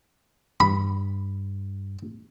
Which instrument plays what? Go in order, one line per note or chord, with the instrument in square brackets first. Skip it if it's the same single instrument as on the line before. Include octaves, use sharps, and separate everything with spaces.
[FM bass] G2 [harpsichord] B5